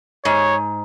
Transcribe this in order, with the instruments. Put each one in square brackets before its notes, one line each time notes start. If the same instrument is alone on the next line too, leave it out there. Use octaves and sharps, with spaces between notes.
[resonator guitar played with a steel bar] G#2 [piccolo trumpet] C#5